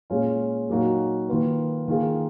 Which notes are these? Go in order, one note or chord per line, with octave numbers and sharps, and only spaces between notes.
A#2 G#3 C#4 F4
A#2 F#3 A#3 D#4 F#4
D#3 A#3 F4 B4
D#3 A#3 F4 G#4